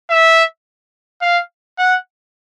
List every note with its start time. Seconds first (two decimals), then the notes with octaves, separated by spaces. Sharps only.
0.10 E5
1.22 F5
1.79 F#5